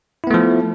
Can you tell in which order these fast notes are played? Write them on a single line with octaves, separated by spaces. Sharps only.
E4 B3 A3 F3